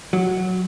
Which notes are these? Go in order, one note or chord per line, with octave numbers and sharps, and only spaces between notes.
F#3